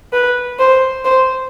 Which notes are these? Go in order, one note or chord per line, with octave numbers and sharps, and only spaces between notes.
B4
C5
C5